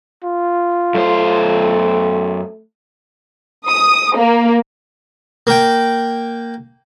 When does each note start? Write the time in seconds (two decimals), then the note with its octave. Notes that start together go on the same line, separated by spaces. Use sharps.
0.24 F4
0.95 F#2 A3 C5
3.67 D#6
4.17 A#3
5.47 A#3 G5